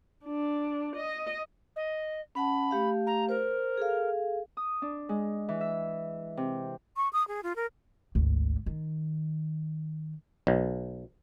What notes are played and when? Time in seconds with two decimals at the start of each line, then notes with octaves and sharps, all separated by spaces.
0.25 D4
0.96 D#5
1.76 D#5
2.35 C#4 F#5 A5 B5
2.71 A3 G4 F5
3.06 A#5
3.29 A#4 C5
3.77 G#4 A4 F5
4.57 D#6
4.82 D4
5.09 G#3
5.49 E3
5.61 E5
6.37 C3
6.97 C#6
7.13 D#6
7.28 G#4
7.43 F4
7.56 A#4
8.15 G#1 D2
8.66 D#3
10.47 B1